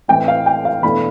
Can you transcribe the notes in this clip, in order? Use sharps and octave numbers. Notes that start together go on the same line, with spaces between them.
A2 E3 A3 C4 G5
F5
G5
F5
E2 B2 A3 D4 B5